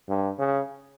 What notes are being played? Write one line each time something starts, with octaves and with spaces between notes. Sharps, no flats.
G2
C#3